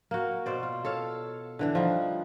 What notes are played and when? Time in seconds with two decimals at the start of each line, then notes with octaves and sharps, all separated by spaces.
0.11 A#3 F#4
0.46 B2 C5 D5
0.63 F4
0.85 A4 C#5 F5
1.59 D3 E3 D4
1.75 F3 G3 D#4